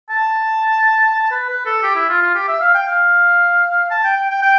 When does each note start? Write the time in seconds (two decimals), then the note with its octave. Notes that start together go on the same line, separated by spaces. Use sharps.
0.10 A5
1.32 B4
1.49 B4
1.66 A4
1.83 G4
1.96 E4
2.09 F4
2.22 F4
2.35 G4
2.48 E5
2.61 F5
2.75 G5
2.88 F5
3.91 A5
4.04 G5
4.17 G5
4.30 G5
4.43 G5